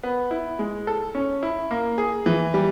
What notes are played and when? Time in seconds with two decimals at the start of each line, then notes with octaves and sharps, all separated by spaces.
0.03 B3
0.31 E4
0.59 G#3
0.87 A4
1.15 C#4
1.43 E4
1.71 A#3
1.98 G#4
2.26 E3
2.54 G3